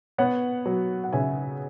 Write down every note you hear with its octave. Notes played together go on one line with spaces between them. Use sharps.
B3 C#5 F#5
F#3
F#5
C#3 E5 G#5